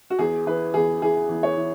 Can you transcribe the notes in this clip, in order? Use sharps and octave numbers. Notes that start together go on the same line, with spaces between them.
F#4
E2 G#4
E3 B4
E2 G#4
E3 G#4
E2
C#5
E3